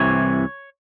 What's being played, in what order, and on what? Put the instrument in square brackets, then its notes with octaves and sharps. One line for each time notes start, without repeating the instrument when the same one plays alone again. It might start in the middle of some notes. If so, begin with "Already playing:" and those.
Already playing: [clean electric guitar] C2 C3 E3 C#5